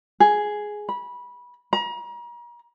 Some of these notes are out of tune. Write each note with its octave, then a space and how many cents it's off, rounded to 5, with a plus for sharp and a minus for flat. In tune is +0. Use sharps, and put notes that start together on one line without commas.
G#4 +5
B5 -20
A#5 +40